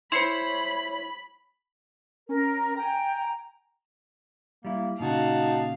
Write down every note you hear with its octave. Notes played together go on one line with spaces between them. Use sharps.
E4 C5 C#5 B5 C6 C7 C#7
C#4 A#4
G5 G#5 A#5
G3 A#3 E4
A#2 C#3 D#4 F#4 F5 A5